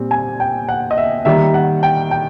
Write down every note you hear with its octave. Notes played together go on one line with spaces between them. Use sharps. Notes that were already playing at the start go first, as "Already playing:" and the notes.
Already playing: A#2 G3 C4
G#5
G5
F#5
D#5
E5
D#3 G3 A#3 E5
F#5
G5
G5